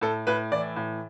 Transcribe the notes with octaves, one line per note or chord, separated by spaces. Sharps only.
A2 A4
A2 B4
E3 D5
A2